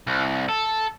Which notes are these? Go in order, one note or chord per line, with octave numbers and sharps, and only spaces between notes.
C2
A4